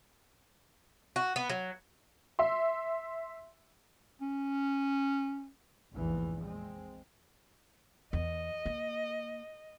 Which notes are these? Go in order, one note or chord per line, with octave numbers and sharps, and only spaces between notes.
F#4
B3
F#3
E5 C6
C#4
F1 A#1 E2 G#2 E3
G#3 C4
E2 D#5
A#3